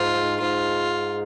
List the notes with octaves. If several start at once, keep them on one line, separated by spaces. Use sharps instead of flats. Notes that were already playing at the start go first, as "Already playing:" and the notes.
Already playing: G#2 F4
G#2 F4